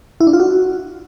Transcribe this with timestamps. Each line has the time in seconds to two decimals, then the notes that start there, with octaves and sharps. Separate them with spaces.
0.20 E4
0.27 D4
0.33 F4
0.40 F#4